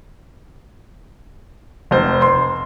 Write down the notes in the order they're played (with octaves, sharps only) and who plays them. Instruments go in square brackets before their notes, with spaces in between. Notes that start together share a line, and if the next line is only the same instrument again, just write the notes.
[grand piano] F1 C5
C6